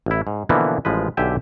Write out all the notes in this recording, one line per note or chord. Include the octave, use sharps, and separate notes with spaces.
A1 E4
G#2
B2 D3 E3 F3 A#3 B3
A1 F3 G#3 B4
B1 D3 G4 E5 G5 G#5